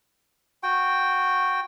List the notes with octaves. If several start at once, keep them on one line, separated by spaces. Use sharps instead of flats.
F#4 G5